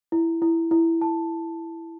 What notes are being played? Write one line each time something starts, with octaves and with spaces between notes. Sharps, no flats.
E4
E4
E4
A5